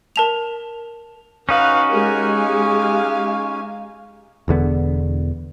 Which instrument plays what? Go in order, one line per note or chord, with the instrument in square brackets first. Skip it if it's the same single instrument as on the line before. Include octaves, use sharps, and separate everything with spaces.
[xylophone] A#4 A5 F7
[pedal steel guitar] C#4 D#4 F#4 [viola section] B4 [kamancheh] F5
[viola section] G#3 G4 G#5 [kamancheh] A#4
[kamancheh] F5
[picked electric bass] E1 E2 D3 B3